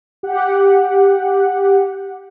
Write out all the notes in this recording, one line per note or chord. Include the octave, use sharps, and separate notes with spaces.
G4 F#5